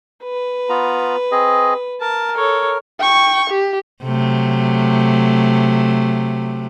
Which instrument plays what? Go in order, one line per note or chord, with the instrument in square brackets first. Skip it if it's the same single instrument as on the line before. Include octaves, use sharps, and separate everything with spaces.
[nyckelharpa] B4
[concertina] B3 F4 A#5
C4 G#4 D#5
[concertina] A#4 [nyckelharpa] A5
[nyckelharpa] A4 C#5
[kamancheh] G5 C#6
G4
[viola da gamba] C3 F#3 A3